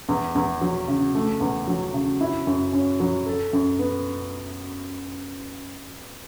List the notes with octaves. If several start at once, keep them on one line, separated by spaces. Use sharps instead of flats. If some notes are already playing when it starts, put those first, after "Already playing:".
E2
E2
F#3
C#3
A3
E2
F#3
C#3
E4
F#2
C#4
F#3
A4
F#2
B3